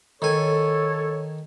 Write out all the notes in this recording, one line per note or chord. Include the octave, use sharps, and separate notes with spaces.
D#3 A4 C#5 G#5